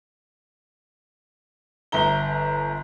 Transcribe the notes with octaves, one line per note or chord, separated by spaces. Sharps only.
G1 E5 A#5 G7